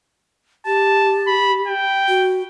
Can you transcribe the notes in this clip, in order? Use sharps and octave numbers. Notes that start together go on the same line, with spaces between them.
G4 A5
B5
G5
F#4